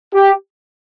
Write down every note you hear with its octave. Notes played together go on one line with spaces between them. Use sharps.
G4